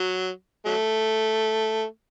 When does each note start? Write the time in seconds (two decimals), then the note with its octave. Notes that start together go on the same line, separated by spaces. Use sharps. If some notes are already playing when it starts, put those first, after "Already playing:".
Already playing: F#3
0.66 F#3 A3